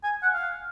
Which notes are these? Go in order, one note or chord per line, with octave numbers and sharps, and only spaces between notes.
G#5
F#5
F5